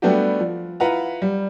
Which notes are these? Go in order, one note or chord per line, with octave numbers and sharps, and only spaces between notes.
G3 A3 B3 D4 F#4 G4
F3
E4 F4 B4 F#5 A#5
G3